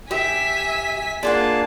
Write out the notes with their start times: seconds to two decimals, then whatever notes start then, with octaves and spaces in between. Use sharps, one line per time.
0.11 G4 E5 G#5 B6
1.23 A#3 D4 F4 G#4 F#5 A5